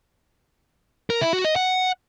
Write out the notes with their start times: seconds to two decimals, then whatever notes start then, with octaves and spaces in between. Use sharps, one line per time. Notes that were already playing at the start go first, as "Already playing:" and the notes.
1.10 A#4
1.21 E4
1.33 F#4
1.45 D#5
1.56 F#5